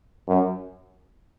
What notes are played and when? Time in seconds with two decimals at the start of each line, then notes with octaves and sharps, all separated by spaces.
0.28 F#2